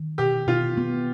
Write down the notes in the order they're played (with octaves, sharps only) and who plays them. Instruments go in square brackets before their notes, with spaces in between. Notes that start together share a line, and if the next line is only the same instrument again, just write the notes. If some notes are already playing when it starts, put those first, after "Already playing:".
Already playing: [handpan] D#3
[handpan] B2 [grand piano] G4
[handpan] B2 [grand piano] F4
[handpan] B3